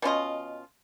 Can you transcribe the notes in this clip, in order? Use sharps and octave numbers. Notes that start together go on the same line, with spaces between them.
B2 C#4 F4 D#5